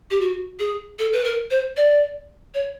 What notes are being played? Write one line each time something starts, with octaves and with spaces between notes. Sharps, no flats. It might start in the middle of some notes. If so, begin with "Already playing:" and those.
G4
F#4
G#4
A4
B4
A#4
C5
D5
C#5